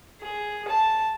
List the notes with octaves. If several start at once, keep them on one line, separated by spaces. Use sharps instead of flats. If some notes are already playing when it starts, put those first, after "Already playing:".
G#4
A5